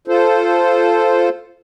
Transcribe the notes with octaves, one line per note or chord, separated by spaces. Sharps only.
F4 A4 C5